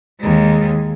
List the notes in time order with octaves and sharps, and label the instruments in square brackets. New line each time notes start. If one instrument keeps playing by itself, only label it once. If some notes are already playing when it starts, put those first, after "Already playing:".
[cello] D#2 G#3